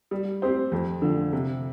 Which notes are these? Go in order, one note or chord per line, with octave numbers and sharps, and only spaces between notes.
G3
C4 G4 C5
F2
D3 F3
C3